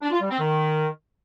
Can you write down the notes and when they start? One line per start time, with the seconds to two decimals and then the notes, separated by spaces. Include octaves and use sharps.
0.02 D4
0.11 F4
0.20 G3
0.30 C4
0.39 D#3